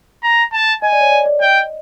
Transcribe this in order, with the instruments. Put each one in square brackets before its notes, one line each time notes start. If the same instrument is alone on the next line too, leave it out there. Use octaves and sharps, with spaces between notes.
[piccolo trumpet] A#5
A5
[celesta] D#5 [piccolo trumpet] G#5
[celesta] D5
C#5
D5
D5
[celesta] D#5 [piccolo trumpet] G5